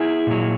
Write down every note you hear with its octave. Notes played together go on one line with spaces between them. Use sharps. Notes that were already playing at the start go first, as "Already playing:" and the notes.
Already playing: E4 G#4
A#2 F#3